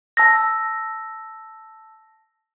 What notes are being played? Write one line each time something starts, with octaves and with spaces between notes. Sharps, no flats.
A5 E6 A#6